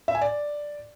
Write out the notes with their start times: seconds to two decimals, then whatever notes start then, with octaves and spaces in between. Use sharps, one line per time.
0.08 E5
0.15 G#5
0.21 D5